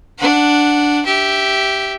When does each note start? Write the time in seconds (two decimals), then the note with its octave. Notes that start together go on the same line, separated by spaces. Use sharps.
0.18 D4 F#5
1.05 G4 E5